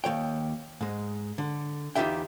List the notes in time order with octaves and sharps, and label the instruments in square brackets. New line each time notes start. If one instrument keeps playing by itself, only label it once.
[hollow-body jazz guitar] D#2 F3 C#5 G5
G#2 G#3
D3
E2 D#4 F4 G4 E5 G5